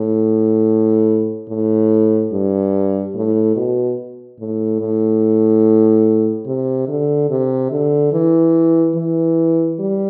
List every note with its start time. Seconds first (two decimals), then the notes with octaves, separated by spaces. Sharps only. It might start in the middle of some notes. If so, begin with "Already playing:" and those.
Already playing: A2
1.49 A2
2.32 G2
3.15 A2
3.56 B2
4.39 A2
4.81 A2
6.46 C3
6.88 D3
7.30 C3
7.71 D3
8.12 E3
8.95 E3
9.79 G3